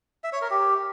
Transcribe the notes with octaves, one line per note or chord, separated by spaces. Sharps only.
E5
C#5
A#4
G4